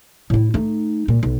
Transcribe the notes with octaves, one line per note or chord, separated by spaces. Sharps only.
A2 E4
A3 D#4
A#2
B1